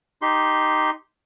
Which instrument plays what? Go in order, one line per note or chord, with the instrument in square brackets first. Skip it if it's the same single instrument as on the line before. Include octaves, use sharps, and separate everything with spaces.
[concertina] D#4 G4 C6